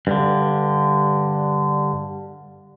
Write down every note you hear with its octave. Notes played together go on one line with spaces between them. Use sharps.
G2 D3